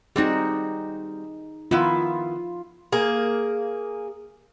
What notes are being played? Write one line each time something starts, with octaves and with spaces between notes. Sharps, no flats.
G3 C4 D#4 F#4 G#4
D#3 B3 E4 F4
A#3 G#4